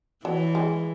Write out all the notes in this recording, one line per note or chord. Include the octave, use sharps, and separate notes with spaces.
E3 F#3
G#3